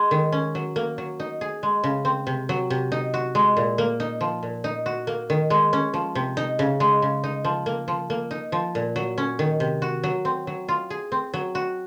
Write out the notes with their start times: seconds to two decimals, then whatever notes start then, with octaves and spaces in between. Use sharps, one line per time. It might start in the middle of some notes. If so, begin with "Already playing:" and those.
Already playing: G#3
0.11 D#3
0.32 C#4
0.55 F#3
0.76 A#3
0.98 F#3
1.20 D#4
1.41 G#4
1.63 G#3
1.84 C#3
2.05 C4
2.27 C3
2.49 F#3
2.70 C3
2.92 D#4
3.14 F#4
3.35 G#3
3.57 A#2
3.78 A#3
4.00 D#4
4.21 F3
4.43 A#2
4.64 D#4
4.86 F#4
5.07 A#3
5.30 D#3
5.50 G#3
5.73 C#4
5.94 F3
6.15 C3
6.37 D#4
6.59 C#3
6.80 G#3
7.02 C#3
7.24 D#4
7.45 F3
7.66 A#3
7.88 F3
8.10 A#3
8.31 D#4
8.52 F3
8.75 A#2
8.96 F#3
9.18 C#4
9.39 D#3
9.60 C3
9.82 F#4
10.04 F#3
10.25 C4
10.47 F#3
10.68 F4
10.90 G#4
11.12 C4
11.34 F#3
11.55 F#4